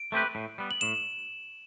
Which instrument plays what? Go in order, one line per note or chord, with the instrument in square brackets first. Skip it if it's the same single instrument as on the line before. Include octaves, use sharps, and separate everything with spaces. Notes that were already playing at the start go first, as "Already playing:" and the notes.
Already playing: [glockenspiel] D7
[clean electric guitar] A3 C4 G4 B4
A2
G3 B3
[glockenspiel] F#7
[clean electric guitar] A2 [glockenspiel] E7